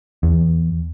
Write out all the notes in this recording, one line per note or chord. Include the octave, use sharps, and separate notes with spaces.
E2